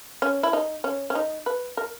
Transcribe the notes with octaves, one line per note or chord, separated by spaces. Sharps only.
C#4
E4
D#4
C#4
C#4
D#4
B4
A#4